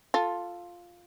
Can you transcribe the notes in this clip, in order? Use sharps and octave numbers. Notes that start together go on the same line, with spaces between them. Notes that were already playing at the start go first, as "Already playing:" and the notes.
F4 A4